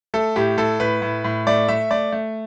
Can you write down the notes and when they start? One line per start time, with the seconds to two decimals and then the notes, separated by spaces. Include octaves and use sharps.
0.14 A3 A4
0.36 A2 G4
0.57 A2 A4
0.80 A2 B4
1.02 A2
1.24 A2
1.47 A3 D5
1.68 A3 E5
1.91 A3 D5
2.12 A3